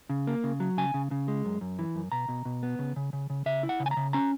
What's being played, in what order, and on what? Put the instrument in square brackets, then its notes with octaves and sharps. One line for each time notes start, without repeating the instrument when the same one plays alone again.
[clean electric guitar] C#3
A#3
C#3
F#3
C#3 G#5
C#3
C#3
G#3
F#2
F#2
E3
F#2
B2 A#5
B2
B2
B3
C#3
C#3
C#3
C#3
C#3 E5
E4
F#5
C#3
G#5
A#5
C#3
C#4 A#5